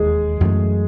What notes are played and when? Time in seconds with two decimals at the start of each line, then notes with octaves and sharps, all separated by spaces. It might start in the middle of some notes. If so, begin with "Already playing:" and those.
Already playing: E1 D#2 D#3 G#3 G#4
0.41 F#2 E3 A3